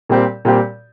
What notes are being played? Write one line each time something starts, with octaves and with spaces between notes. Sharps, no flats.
A#2 G3 C4 G4
A#2 G3 C4 G4